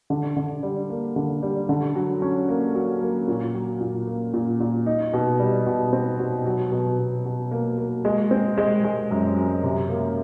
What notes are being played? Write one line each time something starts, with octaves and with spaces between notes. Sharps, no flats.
D3
D3
G3
A#3
D3
G3
D3
F#3
C#4
A#3
F#3
A#3
A#2
F#3
A#2
A#3
A#2
A#2
D#4
B2
G3
B2
C4
B2
F#3
B2
B2
B2
A#3
A#3
G#3
C4
G#3
G#3
F#2
F#2
C3
A#3